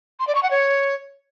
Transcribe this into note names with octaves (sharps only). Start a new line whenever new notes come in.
C6
D5
C#6
F#5
C#5